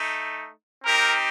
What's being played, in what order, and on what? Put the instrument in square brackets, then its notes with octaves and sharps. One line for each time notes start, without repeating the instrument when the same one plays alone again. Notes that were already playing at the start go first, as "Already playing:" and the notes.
Already playing: [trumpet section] A3 D#4
C4 D#4 G4 A#4